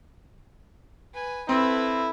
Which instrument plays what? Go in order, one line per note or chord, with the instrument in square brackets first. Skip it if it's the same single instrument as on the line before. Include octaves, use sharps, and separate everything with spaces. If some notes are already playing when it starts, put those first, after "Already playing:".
[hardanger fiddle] B4 G#5
[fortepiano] C4 [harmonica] E4 [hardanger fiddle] A4 B4